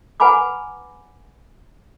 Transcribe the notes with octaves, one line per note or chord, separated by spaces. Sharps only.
B4 F#5 G#5 A#5 B5 D6